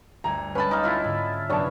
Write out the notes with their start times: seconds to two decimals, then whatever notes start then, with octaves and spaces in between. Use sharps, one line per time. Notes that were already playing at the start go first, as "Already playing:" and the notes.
0.24 G1 D2 A#5 G#6
0.55 G#3 C#4 B4 A5 B5
0.71 D#4 F5 D6
0.83 E4 F4
1.04 G#2 D3
1.49 F#1 F#2 C3 B3 D4 C#5 A5